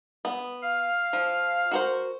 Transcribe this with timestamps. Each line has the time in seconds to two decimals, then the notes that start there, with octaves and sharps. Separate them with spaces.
0.25 B3
0.62 F5
1.13 F3
1.71 F#4 A#4 C5